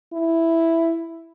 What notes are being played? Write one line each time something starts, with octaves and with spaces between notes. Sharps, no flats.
E4